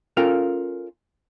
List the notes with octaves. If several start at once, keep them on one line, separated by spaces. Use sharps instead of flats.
C#4 F4 A4 A#4 F5 G5